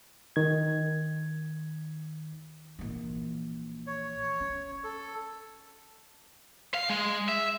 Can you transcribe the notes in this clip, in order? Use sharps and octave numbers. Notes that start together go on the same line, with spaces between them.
D#3 G#6
A#1 E3
C#5
C#4
A4
F5
G#3
E5